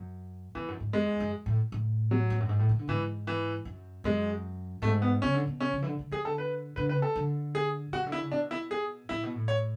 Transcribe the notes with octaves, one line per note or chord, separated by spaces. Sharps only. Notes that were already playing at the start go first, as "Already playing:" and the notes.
Already playing: F#2
E2 E3
F#2
G#2
F#2 G#3
E2
F#2
A2
A2
F#3
E2
F#2
G#2
A2
E3
D3
G#2 E3
E3
F#2
F#2 G#3
G#2 A3
B3
C#3 C#4
D3
B2
C#3 C#4
C#3
E3
D3
D3
E3 G#4
D3 A4
B4
D3 B4
C#3 B4
A4
D3
G#4
E3 F#4
C#3
D3
E4
C#3
B2 D4
E4
G#4
A2 E4
B2
A2
C#5